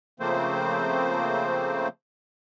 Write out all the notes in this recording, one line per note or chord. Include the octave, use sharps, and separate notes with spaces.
C#3 F3 A3 A#3 C4 C5